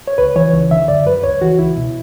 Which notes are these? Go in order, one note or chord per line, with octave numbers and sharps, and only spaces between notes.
C#5
C#2 B4
E3 C#5
C#2
D3 E5
F#2 D5
F#2 B4
C#2 C#5
E3 F#4
C#2 E4
B2